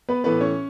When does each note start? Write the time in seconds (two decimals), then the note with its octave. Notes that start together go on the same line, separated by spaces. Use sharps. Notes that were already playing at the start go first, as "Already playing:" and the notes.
0.09 B3 B4
0.24 A2 E3 A3 B3 B4
0.41 C#4 C#5